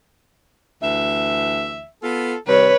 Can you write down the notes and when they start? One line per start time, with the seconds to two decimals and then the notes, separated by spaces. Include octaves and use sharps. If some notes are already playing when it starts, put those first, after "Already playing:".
0.82 D2 E3 E5
2.03 B3 F4 A4
2.47 C3 D#3 G3 B4 C#5